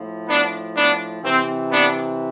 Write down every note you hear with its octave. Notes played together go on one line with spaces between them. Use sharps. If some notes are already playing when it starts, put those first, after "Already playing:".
Already playing: A2 F3
B3 D4
B3 D4
C3 E3 C4
B3 D4